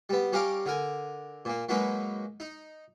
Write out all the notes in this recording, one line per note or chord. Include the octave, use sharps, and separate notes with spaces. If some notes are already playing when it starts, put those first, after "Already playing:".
G3 B3
G3 C#4 G4 A#4 F5 D6
D3 A#4 G#5
A#2 A#3
F#3 G#3 A#3 D#4 B4
D#4